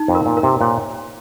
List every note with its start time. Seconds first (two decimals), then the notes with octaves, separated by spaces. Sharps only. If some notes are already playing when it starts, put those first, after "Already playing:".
Already playing: D#4
0.08 F2
0.15 A#4
0.26 A#2
0.37 A#4
0.43 C3
0.61 A#2 C#5